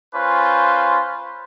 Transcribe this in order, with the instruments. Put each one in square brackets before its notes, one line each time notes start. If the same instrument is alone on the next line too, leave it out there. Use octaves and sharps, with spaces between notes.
[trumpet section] C#4 F4 B4 C5